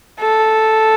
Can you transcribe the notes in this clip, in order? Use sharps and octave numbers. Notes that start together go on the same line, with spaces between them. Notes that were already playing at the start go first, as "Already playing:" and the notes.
A4